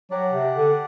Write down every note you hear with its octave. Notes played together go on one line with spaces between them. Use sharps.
F#3 D4 G4 D5 F#5
C3
D3